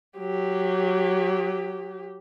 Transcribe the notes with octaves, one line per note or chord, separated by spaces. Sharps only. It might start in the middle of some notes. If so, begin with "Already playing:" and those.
F#3 G4